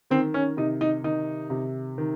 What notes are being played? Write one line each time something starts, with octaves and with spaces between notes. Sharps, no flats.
D#3 C4
C#4
C3 D#4
D#4
D#3 D#4
C3
D#3